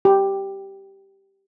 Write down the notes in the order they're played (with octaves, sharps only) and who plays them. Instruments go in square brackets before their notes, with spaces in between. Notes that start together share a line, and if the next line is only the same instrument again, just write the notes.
[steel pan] G4